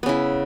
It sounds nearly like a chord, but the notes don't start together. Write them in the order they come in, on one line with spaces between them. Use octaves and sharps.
B3 C#3 E4